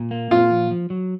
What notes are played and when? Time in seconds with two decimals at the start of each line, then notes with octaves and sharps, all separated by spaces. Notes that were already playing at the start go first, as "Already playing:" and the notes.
Already playing: A#2
0.11 A#3
0.31 A#2 F4
0.51 F3
0.71 F3
0.90 F#3